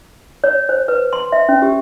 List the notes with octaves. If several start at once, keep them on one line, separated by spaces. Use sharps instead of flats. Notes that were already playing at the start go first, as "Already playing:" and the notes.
C#5
C5
B4
C6
E5
C#4
G4